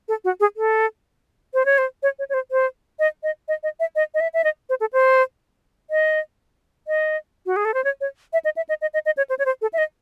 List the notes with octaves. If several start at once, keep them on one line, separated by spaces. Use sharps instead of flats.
A4
F#4
G#4
A4
C5
C#5
C5
C#5
C#5
C#5
C5
C5
D#5
D#5
D#5
D#5
E5
D#5
D#5
E5
E5
D#5
C5
A4
C5
D#5
D#5
F#4
G#4
A4
C5
C#5
C#5
E5
D#5
E5
D#5
D#5
D#5
D#5
C#5
C5
C#5
C5
A4
E5
D#5